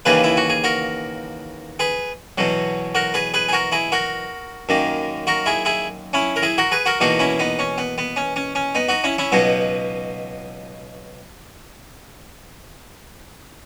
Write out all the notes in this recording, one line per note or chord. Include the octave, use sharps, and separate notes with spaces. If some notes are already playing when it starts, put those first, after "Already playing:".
D#2 C#3 E3 A#3 G#4 B4
E4
F#4
G#4
F#4 A#4
G#4 B4
E2 B2 F#3
F#4 A#4
G#4 B4
G#4 B4
G#4
F#4 A#4
E4 G#4
F#4 A#4
F#2 D#3 A#3
F#4 A#4
E4 G#4
E4 G#4
C#4 E4
A#4
E4 G#4
F#4 A#4
G#4 B4
F#4 A#4
E2 B2 A#3 D#4 F#4
C#4 E4
B3 D#4
C#4
B3
B3
C#4
C#4
C#4
B3 D#4
D#4 F#4
C#4 E4
C#4 E4
C#2 B2 F#3 B3 D#4